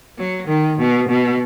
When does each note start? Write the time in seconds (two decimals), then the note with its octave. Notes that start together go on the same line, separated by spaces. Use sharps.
0.18 F#3
0.48 D#3
0.79 B2
1.09 B2